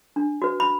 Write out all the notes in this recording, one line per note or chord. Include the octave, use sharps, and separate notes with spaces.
D4
F#4 B4
B5